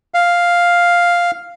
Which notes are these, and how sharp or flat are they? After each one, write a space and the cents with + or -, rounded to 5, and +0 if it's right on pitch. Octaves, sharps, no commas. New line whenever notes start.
F5 +0